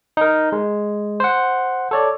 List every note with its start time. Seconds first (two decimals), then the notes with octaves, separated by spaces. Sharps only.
0.17 D#4 A#4
0.52 G#3
1.20 C5 F#5
1.91 A4 C#5 D5